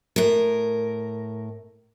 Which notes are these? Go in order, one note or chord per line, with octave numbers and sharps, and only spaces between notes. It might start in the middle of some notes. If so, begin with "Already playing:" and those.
A2 A#4